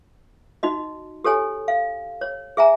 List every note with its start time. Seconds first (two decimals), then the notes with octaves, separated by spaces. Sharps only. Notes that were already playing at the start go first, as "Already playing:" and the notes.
0.63 D#4 F#4 D#5
1.24 G4 A4 C#5 G#5
1.68 F5
2.21 C#5
2.57 G#4 E5 G#5 A#5